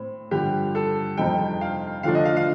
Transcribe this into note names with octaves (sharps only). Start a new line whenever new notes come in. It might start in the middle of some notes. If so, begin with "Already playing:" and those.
Already playing: A2 C4
G2 D3 F3 G4
A4
F2 C3 G3 C4 D#4 G5
F5
D3 F3 A3 D4 F5
D#5
F5
F5